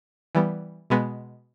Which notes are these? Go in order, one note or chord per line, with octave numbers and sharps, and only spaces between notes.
E3 G3 B3
B2 G#3 B3